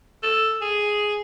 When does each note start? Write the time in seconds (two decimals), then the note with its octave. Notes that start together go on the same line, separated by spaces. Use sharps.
0.23 A4
0.61 G#4